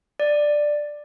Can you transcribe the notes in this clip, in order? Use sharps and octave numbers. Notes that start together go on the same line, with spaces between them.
D5